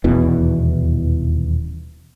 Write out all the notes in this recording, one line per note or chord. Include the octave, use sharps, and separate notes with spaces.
D#1 E2 B2 E3